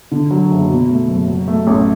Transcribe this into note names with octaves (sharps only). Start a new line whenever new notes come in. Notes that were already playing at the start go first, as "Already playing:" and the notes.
D3
F#3
F#1
B2
A3
F#1
F#3
A3
A1